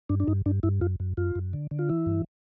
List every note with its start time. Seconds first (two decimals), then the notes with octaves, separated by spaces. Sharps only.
0.09 G2 D4
0.20 D4
0.27 G2 D#4
0.46 G2 D4
0.63 G2 E4
0.81 F#2 F4
1.00 F#2
1.17 F#2 F4
1.35 F#2
1.53 D3
1.71 D3
1.79 F4
1.89 E3 E4
2.06 G2